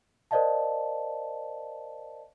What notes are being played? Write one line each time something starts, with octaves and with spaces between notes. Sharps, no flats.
A#4 C5 D5 D#5 F5 A5